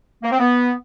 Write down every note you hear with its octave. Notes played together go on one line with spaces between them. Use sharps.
A#3
C4
B3